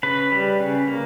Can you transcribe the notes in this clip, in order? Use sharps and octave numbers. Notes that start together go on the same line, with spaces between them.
C#3 B4
G3
C#3
A#3